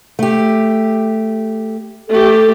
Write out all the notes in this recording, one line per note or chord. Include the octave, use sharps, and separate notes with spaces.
A3 G4
A3 G4 A4